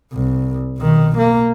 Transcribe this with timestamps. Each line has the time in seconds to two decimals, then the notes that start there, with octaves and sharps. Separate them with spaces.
0.13 C2
0.78 B1 D#3
1.18 A#3